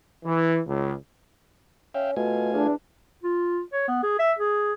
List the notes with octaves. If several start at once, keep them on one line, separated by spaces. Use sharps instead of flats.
E3
C#2
C#4 E5 F5 G5
B2 A3 F4 G#5
E2 D4
F4
C#5
B3
G#4
E5
G#4